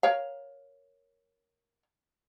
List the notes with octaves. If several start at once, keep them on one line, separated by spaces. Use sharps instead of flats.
A#4 C#5 F5